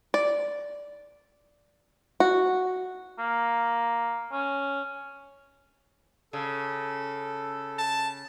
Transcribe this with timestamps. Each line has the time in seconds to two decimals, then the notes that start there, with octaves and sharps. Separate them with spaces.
0.14 D5
2.20 F#4
3.19 A#3
4.32 C#4
6.33 C#3 A4
7.79 A5